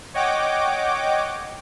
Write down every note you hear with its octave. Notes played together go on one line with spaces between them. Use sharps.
C#5 D#5 F#5 G5 D6